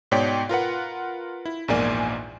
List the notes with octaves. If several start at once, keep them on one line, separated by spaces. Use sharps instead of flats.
G#2 B2 C#5 D5 G5 B6
F4 A#4 B4 F#5
E4
A#1 E2 G#2 A#3 D5 G#5